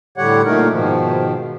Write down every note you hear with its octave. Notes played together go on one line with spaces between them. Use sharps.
A2 D3 G3 G4 C#5 F#5
A#2 A3 D#4 A#4
G#2 B2 D#3 F3